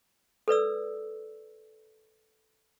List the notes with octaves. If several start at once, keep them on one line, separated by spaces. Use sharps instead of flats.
A4 B4 D5 E6